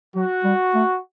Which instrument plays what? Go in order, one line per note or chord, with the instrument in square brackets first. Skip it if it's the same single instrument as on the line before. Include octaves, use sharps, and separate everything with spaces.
[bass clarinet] F#3 [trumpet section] F#4
[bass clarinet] G3
A3